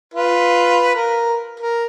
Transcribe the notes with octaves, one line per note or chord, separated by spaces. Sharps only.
F4 B4
A#4
A#4